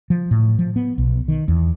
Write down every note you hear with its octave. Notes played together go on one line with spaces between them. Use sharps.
F3
A2
F3
B3
B1
D#3
E2